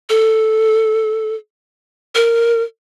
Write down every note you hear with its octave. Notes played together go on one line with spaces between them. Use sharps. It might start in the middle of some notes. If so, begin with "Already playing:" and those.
A4
A#4